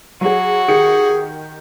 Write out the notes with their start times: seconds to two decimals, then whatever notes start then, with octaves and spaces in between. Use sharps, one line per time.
0.21 F#3 F#4 G#4
0.68 D#3 G4 G#4 C#7